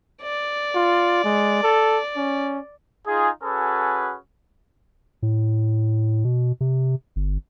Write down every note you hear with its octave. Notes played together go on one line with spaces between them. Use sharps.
D5
F4
G#3
A4
C#4
D#4 F4 G#4
C#4 F#4 G#4 A4 B4
A2
B2
C3
G1